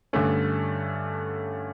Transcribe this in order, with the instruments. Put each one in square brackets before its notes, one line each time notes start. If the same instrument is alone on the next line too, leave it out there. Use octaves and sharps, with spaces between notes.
[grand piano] G2 D3 A3 C#4